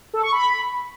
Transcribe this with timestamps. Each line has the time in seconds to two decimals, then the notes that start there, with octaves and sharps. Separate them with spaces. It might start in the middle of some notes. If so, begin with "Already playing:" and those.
0.14 A4
0.23 C#6
0.32 B5